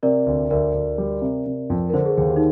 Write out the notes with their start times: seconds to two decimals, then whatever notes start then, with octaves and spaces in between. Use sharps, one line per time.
0.03 C3 A#4 D5
0.26 D2
0.50 D2 A#4 D5
0.74 D2
0.98 G3
1.22 C3
1.46 C3
1.70 F2
1.89 A#4
1.94 D3 C5
2.05 G#4
2.17 D#2 G#4
2.29 G4
2.36 D#4